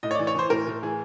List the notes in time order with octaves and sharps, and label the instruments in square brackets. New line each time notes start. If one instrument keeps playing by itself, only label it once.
[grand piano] A2 D#5
C#5
E3 D5
C#5
E3 C5
A2 A#4
A2
E3 G#4